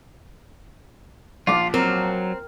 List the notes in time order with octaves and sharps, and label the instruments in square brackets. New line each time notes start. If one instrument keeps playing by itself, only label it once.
[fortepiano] A#1 D6 [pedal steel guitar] F4
[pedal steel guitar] F#3 [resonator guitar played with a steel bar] C4 [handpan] A#4